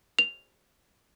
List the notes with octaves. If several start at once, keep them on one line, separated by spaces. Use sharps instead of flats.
F7